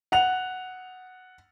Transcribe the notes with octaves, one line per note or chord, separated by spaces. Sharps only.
F#5 F7